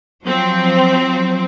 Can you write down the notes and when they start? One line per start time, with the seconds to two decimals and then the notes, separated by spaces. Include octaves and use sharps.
0.25 F3 F#3 C4 C5